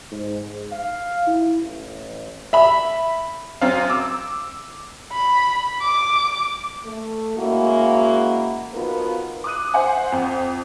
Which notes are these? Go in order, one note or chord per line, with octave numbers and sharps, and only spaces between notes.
G#2
F5
E4
A1
E5 B5
F#2 C4 F5
D6 E6
B5
D6
A3
C#3 G#3 A#3 E4 F#4
F3 B3 D#4 F4 F#4 A#4
D6 D#6 F#6 D#7
C5 E5 F#5 G#5
F2 G5